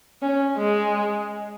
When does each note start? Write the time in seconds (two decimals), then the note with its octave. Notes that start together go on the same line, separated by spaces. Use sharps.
0.22 C#4
0.58 G#3